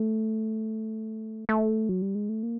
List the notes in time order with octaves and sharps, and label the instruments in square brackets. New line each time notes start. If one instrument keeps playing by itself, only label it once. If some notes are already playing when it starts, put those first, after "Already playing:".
Already playing: [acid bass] A3
A3
F#3
G3
G#3
A3
A#3